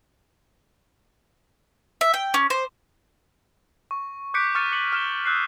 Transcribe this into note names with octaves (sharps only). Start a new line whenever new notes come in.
E5
G5
C#4
C5
C#6
D6 F#6 G6 B6 C#7 D7
C#6 F6 A6 C#7 D#7
D6 C#7 F#7
F6 E7 G7
D#6 E6 F#6 G6 C7